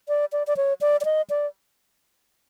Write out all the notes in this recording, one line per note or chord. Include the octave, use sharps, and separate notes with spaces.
D5
D5
D5
C#5
D5
D5
D#5
D5